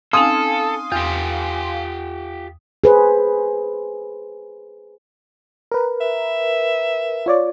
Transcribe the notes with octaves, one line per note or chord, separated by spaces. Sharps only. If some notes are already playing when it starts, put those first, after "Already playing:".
C4 C#4 D#4 A4 F5 G#5 C6 D#6
E2 F4 G4
G#4 B4 C5
A#4 B4
E5
F4 C#5 D5